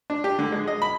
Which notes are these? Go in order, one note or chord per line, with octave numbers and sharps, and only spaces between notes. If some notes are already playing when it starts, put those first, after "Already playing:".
D4
G4
D3
G#3
D#5
B5